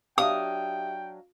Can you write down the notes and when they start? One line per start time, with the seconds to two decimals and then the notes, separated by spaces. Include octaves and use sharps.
0.18 F#3 D4 G4 E5 F5 G5 D#6